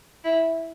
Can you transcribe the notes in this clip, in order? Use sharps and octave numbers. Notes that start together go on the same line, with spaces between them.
E4